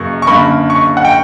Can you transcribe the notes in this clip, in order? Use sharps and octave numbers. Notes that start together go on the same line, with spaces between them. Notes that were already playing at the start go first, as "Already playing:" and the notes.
Already playing: F#2 C#3 F#3 A#3 C#6
C#6
F#2 D3 A#3 B5
C#6
F#5
G5